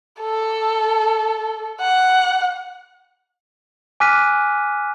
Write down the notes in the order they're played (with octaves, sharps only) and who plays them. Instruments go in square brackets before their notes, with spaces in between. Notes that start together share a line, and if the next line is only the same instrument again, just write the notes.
[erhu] A4
F#5
[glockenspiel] G#5 D6 F6 F#6 B6 D#7